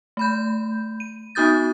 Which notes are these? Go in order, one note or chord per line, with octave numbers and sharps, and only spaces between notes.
A3 B5 G6
D#7
B3 D#4 F#4 D#6 G6 A6